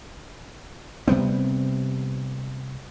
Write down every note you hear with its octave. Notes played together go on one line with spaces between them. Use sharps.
C3 G3 B3 C4